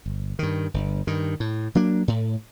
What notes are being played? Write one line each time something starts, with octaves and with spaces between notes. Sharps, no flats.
G1
G2 D#3
G1
G2 D#3
A2
F#3 A#3 D4
A2